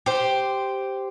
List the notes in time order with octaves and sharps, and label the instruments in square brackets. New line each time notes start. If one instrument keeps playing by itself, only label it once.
[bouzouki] G4 C5